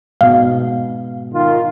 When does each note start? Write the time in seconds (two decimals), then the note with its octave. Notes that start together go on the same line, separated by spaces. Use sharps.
0.21 G#2 B2 F5
1.33 D#3 F4